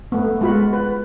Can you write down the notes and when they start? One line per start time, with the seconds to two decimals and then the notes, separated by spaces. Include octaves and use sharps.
0.12 A3 B3
0.41 G#3 B3 F4 F#4 B5
0.73 B4